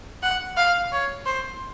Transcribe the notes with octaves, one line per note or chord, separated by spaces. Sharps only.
F#5
F5
C#5
C5